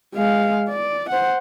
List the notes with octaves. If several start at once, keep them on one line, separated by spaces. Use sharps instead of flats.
G#3 F5
D5
C5 F#5